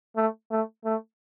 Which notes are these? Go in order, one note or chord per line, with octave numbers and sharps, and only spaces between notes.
A3
A3
A3